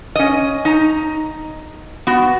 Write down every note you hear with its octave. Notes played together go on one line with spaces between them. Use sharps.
C#4 D#5
D#4 A#5
B3 F#4